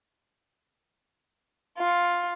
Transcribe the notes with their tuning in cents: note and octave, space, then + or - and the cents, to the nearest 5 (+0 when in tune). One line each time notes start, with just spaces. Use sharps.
F4 +5